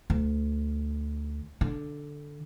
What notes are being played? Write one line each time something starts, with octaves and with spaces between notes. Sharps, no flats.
D2
D3